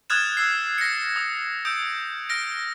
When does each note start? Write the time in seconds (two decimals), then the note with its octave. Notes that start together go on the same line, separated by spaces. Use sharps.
0.10 D#6 F6 F#6 G#6 A6 E7
0.37 E6 C7
0.78 A#6 C#7
1.16 D#6
1.65 D#6 E6 G6 D7
2.29 F6 A#6 D7